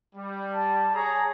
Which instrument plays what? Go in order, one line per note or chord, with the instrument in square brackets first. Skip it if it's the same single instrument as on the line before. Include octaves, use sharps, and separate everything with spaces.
[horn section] G3
[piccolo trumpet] A5
[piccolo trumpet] G#4 [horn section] C#5 A#5